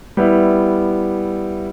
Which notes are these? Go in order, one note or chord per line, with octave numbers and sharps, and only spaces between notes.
G3 B3 E4